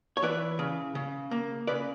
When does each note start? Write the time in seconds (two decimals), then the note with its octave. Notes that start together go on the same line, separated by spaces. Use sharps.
0.17 C#5
0.22 E3 B4 D5
0.59 C#3
0.95 C#3
1.31 A#3
1.67 C#3 B4 D5